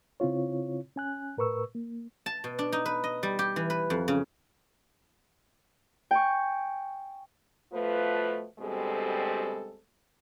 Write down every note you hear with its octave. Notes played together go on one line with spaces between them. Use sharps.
C#3 C4 E4 F4 C#5
C#4 G#5 F#6
A2 A#4 B4 C#6 E6
A#3
A5
B2
D4
D#4
B4
D#5
G3
G4
E3
B4
F2
C#3
G5 G#5 C#6
B2 F3 A3 F4 B4
D2 B2 G3 G#3 C4 A4